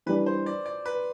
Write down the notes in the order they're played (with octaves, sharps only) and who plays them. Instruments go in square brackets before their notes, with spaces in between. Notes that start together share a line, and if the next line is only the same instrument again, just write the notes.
[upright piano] E3 G3 D4 [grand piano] B4
[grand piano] C5
D5
D5
B4